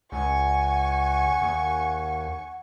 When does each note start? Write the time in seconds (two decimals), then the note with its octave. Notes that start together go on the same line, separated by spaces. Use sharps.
0.12 C#2 F#5 G#5 C#6
1.42 D#2